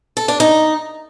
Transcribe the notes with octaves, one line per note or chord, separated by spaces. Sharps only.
A4
D4
D#4